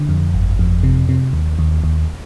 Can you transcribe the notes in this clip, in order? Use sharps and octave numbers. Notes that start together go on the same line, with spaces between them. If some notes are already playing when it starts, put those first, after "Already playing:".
Already playing: D3
F2
G1
F2
C3
C3
D#2
D#2
D#2